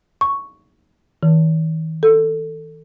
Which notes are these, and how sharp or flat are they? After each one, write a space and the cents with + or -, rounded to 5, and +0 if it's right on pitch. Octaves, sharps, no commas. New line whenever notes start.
C#6 +0
D#3 +45
A4 +15